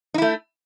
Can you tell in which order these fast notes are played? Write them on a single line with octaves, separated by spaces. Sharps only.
D#4 E4 A3